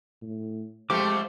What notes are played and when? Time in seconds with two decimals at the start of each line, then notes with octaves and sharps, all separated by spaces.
0.22 A2
0.90 F2 F3 G#3 A3 C4 G4 C5 D6